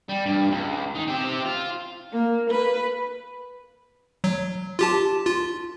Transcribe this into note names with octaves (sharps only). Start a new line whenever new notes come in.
G3
G2
C#2
D#3
C4 G4
F4
A#3
B4
F#3
F4 G4 A5
F4